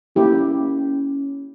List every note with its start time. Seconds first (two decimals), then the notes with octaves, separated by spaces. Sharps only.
0.16 A#3 C#4 E4 G4